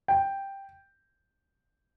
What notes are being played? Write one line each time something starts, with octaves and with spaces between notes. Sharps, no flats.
G5